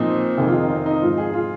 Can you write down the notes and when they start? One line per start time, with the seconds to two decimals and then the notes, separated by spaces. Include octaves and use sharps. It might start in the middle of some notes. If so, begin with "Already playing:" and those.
Already playing: A#2 F3 C4 D#4
0.37 F2 C3 D#3 G#4
0.48 F4
0.59 D#4
0.69 C4
0.86 D#4
1.01 G#2 F3 F4
1.18 G#4
1.34 F4